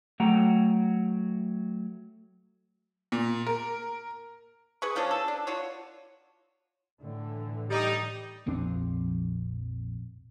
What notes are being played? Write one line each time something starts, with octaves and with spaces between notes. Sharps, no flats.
F#3 A3 F#5 G5 A#5
A#2
A#4
G#4 B4 C#6
E3 F3 C#4 D4
A4
D4
F4 F#4 C#5
A2 D3 E3
G3 D#4
A#1 F2 C4 D4